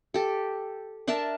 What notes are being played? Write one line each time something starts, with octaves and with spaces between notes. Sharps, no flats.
G4 A4
D4 A#4 E5 A5